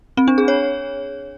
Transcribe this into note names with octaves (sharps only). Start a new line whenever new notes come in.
C4
D4
G#4
C#5